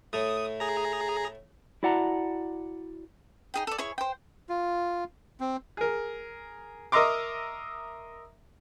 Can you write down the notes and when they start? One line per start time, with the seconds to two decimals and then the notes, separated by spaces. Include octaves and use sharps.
0.13 A2 A3 D#6
0.60 G#4 A#5
1.83 E4 F#4 D5 F#5 A5 A#5
3.54 D#4 G#4 G5
3.67 A4 D5
3.78 E4 G#4 C#5 C#6
3.98 C5 G5
4.49 F4
5.40 C4
5.77 G#4 A#4
6.92 A#4 D#5 E5 A#5 C6 D6